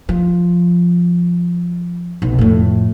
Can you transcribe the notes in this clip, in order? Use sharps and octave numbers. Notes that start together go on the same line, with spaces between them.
F3
B1 C3
F2 A2